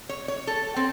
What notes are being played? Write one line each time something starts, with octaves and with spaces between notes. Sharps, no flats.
C#5
C#5
A4
C4